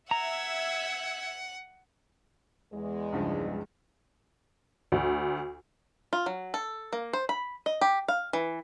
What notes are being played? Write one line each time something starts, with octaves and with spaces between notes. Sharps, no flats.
E5 F#5 A#5 E6 G#6
E2 G#3
C#2 G2 F3
D2
F4
F#3
A4
A#3
C5
B5
D#5
G4
F5
E3